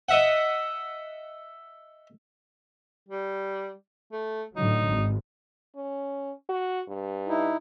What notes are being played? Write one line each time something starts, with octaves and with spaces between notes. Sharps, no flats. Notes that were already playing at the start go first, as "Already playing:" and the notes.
D#5 E5 F#5
G3
A3
A2 D3 F#3 D#4
G#1
C#4
F#4
G2
D#4 E4